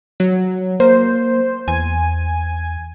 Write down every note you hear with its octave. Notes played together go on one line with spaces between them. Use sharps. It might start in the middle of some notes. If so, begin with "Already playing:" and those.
F#3
A#3 C5
E2 G#5